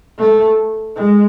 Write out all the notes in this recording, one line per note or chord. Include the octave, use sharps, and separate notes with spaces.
A3
G#3